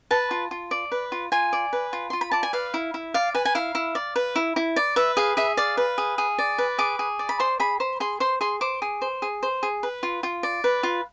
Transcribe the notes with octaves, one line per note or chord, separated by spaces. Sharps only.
B4 A5
F4
F4
D5
B4
F4
F4 G#5
D5
B4
F4
F4 C6
B5
D5 A5
G#5
B4 F5
E4
E4
D5 F5
B4 G#5
G#5
E4 F5
E4
D5
B4
E4
E4
D5
B4 E5
G#4 F5
G#4 E5
D5 F5
B4
G#4
G#4
D5
B4
G#4 D6
G#4
D5
B5
C5 C6
G#4 B5
C5 B5
G#4 C6
C5 C6
G#4 C6
C5 D6
G#4
C5
G#4
C5
G#4
B4
F4
F4
D5
B4
F4